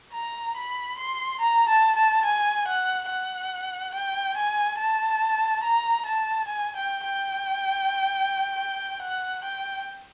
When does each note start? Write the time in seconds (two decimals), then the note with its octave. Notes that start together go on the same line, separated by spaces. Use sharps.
0.13 A#5
0.56 B5
0.98 C6
1.41 A#5
1.69 A5
1.96 A5
2.25 G#5
2.68 F#5
3.09 F#5
3.94 G5
4.37 G#5
4.78 A5
5.63 A#5
6.06 A5
6.48 G#5
6.76 G5
7.05 G5
9.02 F#5
9.44 G5